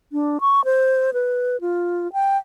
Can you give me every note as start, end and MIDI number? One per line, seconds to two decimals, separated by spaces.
0.12 0.38 62
0.41 0.64 85
0.65 1.11 72
1.13 1.60 71
1.61 2.11 65
2.13 2.37 79